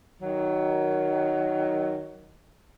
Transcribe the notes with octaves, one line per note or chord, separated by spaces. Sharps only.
D#3 F#3